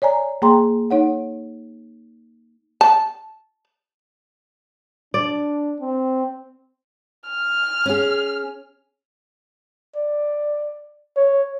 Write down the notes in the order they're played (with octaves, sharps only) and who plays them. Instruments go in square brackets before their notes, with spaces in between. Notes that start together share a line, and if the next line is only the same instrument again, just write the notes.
[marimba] C#5 D5 G#5 A#5
A#3 G#4 G5 A#5 C6
D#4 C#5 F#5
[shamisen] A5
[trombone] D4 [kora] D5
[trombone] C4
[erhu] F6
[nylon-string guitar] C#4 G#4
[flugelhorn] D5
C#5